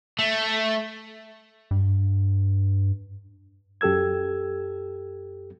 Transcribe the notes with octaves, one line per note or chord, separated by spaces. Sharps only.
A3
G2
F#2 G4 A4 E6 G#6